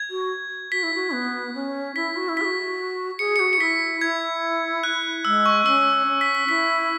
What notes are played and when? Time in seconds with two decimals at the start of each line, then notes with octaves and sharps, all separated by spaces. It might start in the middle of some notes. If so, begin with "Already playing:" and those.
Already playing: G#6
0.11 F#4
0.72 F#4 B6
0.83 E4
0.94 F#4
1.13 B3
1.55 C#4
1.96 E4 B6
2.16 F#4
2.29 E4
2.37 G#4 B6
2.45 F#4
3.19 G#4 C#7
3.36 F#4 C#7
3.53 C#7
3.60 E4 B6
4.01 E4 G#6
4.84 F#6
5.25 G#3 E6
5.46 C#6
5.66 C#4 E6
6.07 C#4
6.21 B6
6.35 B6
6.49 E4 B6